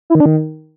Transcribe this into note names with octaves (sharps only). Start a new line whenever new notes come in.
E4
D#3
D4
D#3